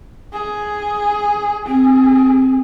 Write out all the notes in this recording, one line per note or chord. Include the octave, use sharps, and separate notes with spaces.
G#4
C4 G#4